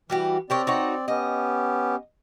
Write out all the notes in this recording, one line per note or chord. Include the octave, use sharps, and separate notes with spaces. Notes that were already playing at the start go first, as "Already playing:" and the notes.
E3 G3 F#4 G4
C4 G4 A#4 C#5 D5
D#4 F#4 C#5
B3 C#4 G4 D#5